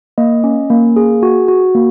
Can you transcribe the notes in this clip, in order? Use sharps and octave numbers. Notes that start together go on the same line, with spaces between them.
A#3 D#5
C#4
A#3
G#4
F#4
F#4
A#3